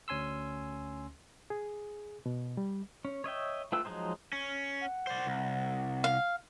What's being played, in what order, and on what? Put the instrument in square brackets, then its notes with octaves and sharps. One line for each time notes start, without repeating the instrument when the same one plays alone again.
[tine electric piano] D2 C#4 G#5 C6 E6
[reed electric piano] G#4
B2
G3
[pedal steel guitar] C#4
C#5 D#5 E5 G5
A3 F4 B4 G5 E6
F3 F#3 G#3 D#4 C5
[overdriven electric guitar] C#4
[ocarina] F#5
[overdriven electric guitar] C5 D5
C2
[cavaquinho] F5